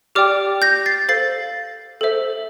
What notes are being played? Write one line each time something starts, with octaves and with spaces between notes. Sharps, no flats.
G4 D5 G5 D6 F6
G6 A#6
A6 C7
A4 C5 F5 A6 C7
A4 C5 E5